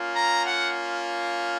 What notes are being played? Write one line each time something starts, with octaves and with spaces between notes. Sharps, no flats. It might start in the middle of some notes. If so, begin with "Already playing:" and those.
Already playing: A#3 C#4 F4
A#5
F#5